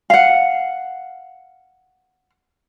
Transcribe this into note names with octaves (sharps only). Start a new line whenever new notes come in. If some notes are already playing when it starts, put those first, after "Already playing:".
F5 F#5